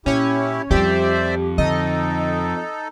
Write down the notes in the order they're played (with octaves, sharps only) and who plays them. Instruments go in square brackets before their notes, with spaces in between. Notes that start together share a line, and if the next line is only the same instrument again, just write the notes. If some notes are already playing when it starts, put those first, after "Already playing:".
[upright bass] A#2 [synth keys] C#4 C#5 [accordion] E4 G4
[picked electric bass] F2 [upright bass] G3 F4 [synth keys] G4 [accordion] C5 D5 E5
[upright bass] D3 [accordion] D#4 A4 [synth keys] D#5